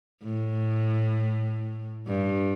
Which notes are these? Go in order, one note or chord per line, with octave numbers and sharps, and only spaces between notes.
A2
G2